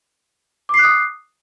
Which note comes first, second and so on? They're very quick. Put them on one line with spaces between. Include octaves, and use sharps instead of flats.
D6 C7 F#6 D#6